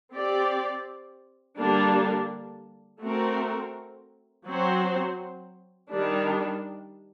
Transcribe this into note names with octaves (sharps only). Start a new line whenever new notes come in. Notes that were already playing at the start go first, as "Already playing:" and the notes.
C4 G4 D5
D3 G3 A#3 D4
A3 C4 F#4 A#4
F#3 C4 F#4 C5
D#3 G3 D4